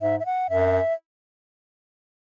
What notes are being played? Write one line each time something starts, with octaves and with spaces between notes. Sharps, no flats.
G#2 E5
E5
F#5
F#2 E5